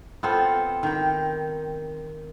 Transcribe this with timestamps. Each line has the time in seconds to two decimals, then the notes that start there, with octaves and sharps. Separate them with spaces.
0.23 B3 C4 F4 A4
0.83 D#3 G5